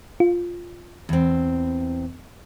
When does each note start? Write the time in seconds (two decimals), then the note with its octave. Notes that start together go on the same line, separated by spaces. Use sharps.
0.20 F4
1.09 E2 C4